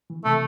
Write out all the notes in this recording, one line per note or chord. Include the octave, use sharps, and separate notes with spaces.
E3
C3 A3